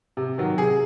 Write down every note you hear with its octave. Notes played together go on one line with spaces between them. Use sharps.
C3
D#3 F#3
C3 G#4